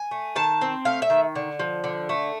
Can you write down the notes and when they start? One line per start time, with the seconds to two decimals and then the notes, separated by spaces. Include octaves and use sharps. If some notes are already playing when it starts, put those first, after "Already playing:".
Already playing: G#5
0.11 A3
0.36 D#3 A5
0.61 C4
0.85 A3 F5
1.02 E5
1.10 D#3
1.35 D3
1.59 F3
1.84 D3
2.09 A3